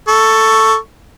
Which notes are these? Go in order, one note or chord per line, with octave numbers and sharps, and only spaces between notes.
A4 C#6